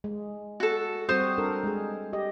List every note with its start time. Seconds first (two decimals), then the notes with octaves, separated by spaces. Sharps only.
0.04 G#3
0.60 F#4 A4
1.09 G3 C4 F#4 C5 D#6
1.38 D4 A4 A#4
1.63 G#3 G#4
2.13 G4 D#5